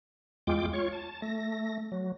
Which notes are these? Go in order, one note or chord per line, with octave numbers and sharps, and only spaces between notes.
E2 G#3 F4 G5 D6
F4 C#5 C#6
A5
A3 A#6
F#3